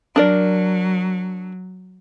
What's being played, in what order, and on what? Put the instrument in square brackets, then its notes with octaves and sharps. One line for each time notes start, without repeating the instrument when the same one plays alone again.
[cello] F#3 [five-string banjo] D4 A#4 D5